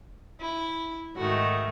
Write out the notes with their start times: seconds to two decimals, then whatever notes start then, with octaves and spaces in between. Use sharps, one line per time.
0.40 E4
1.16 G#2 D#3 A3 F#4